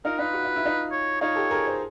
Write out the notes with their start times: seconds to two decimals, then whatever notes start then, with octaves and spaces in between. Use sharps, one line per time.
0.05 D#4 F4 A#4
0.19 D#4 F4 B4
0.33 F#4
0.45 F4
0.56 E4
0.66 D#4 F4
0.92 C#5
1.21 D#4 F4 C#5
1.35 G4 A4
1.51 G#4 A#4
1.67 C5